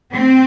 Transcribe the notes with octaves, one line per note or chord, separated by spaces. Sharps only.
C4